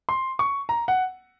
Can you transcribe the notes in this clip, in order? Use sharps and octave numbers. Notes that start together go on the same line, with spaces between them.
C6
C#6
A#5
F#5